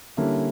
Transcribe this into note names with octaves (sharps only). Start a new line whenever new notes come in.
D3 G3 A#3 C#4 E4